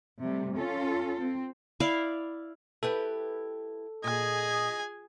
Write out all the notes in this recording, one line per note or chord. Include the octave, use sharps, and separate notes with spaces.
C3 G3 A3
C#4 F4 A4
C4
E4 D5 F5
E4 G4 A4 B4
A#2 G#4 D#5 G#5